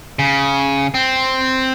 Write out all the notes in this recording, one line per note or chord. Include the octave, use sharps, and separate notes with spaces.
C#3
C4